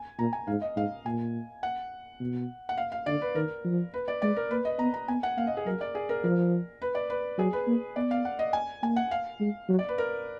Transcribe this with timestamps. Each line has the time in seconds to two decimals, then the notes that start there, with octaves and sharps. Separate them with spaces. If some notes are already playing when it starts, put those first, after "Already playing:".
Already playing: G#5
0.19 A#2 A#5
0.33 G#5
0.47 G#2 F5
0.62 D#5
0.76 G#2 F5
1.05 A#2 G#5
1.63 F#5
2.20 B2
2.69 F#5
2.78 F5
2.92 F5
3.06 D3 D5
3.21 B4
3.35 D#3 A#4
3.64 F3
3.94 B4
4.08 D5
4.22 G#3 D5
4.36 A#4
4.51 A#3 B4
4.65 D#5
4.79 B3 A#5
4.94 A#5
5.08 B3 G#5
5.23 F#5
5.38 A#3 F5
5.47 D#5
5.57 G#4
5.66 F#3 A#4
5.81 D5
5.95 G#4
6.09 A#4
6.24 F3 A#4
6.82 B4
6.95 D5
7.10 B4
7.38 F#3 G#4
7.53 B4
7.67 A#3
7.96 B3 D5
8.11 F5
8.25 F#5
8.39 D#5
8.53 G#5
8.83 A#3 G#5
8.96 F#5
9.11 F5
9.40 G#3
9.69 F#3
9.79 D5
9.89 B4
9.98 A#4